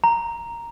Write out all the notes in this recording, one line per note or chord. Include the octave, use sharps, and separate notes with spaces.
A#5